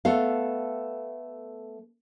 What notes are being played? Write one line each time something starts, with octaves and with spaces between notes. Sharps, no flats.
A3 B3 A4 F5